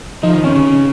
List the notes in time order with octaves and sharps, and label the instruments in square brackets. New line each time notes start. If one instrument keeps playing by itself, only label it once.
[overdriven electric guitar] F3 [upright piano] D#4
[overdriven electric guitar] D#3
[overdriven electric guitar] D#3 [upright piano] C#4
[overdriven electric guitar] C#3